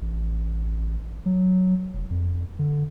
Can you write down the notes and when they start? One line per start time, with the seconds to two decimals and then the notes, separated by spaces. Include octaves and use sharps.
0.02 A1
1.26 F#3
1.93 F1
2.11 F2
2.59 D3